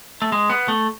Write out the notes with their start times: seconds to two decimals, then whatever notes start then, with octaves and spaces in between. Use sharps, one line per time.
0.22 A3
0.32 G#3
0.50 B3
0.68 A3